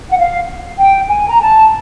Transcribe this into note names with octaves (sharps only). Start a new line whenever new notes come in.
F#5
F5
G5
G#5
A#5
A5